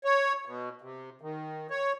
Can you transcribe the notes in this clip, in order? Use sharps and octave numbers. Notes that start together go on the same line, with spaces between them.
C#5
B2
C3
D#3
C#5